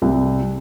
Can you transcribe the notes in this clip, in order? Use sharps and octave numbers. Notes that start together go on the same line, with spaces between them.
C2